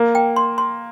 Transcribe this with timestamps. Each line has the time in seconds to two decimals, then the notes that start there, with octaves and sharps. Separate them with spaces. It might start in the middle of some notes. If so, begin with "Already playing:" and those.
Already playing: A#3
0.15 G5
0.36 C6
0.58 C6